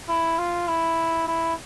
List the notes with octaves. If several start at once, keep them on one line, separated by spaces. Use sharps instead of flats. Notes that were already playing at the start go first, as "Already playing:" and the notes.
E4
F4
E4
E4